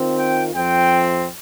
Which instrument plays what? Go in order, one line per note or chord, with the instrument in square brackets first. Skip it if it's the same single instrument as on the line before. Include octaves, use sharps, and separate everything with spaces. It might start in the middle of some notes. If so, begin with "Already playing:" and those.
Already playing: [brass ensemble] D#3 C4 F4
G5
F2 F3 C4 G5